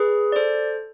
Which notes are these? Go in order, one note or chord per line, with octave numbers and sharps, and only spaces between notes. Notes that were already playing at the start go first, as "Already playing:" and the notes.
Already playing: G#4 B4
D5
A4 C5